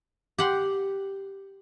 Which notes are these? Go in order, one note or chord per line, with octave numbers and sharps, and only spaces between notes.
G4 F#5 C6